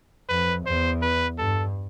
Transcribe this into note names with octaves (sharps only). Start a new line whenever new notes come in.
F2 B4
E2 C5
B4
G2 A4